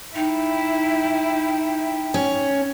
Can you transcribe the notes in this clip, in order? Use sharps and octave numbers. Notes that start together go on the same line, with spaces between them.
D#4 E4 G5
C#4